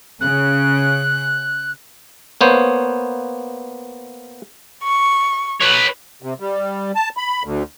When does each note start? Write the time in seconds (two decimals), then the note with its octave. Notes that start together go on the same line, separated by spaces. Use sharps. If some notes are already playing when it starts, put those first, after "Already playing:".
0.21 C#3 F#6
2.41 A#3 B3 C5 C#5
4.83 C#6
5.61 B4 C#5
6.22 C3
6.40 G3
6.95 A5
7.17 B5
7.43 D2